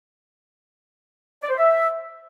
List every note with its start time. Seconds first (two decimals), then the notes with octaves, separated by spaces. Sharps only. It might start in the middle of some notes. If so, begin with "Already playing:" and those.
1.42 D5
1.50 C5
1.57 E5